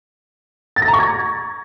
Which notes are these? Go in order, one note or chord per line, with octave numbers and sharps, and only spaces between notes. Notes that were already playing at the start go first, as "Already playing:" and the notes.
A6
A#6
A#5
C#6
G#6